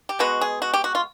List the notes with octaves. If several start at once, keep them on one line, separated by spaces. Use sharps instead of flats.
G4
B2 G#3 B3 F#4
G#4
F#4
G4
F#4
F4